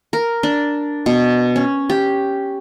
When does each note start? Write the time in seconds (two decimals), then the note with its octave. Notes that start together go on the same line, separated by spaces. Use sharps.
0.13 A#4
0.43 D4
1.06 B2
1.56 C#4
1.90 G4